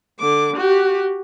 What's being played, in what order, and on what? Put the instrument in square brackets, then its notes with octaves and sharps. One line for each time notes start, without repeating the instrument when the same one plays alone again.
[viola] D3 D6
F#4 G4